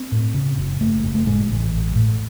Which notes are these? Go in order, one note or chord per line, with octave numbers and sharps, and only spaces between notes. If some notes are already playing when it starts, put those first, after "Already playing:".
Already playing: C4
A2
C#3
F#1
F#1 A3
F#1
A3
A2 G#3
A1
A1
A2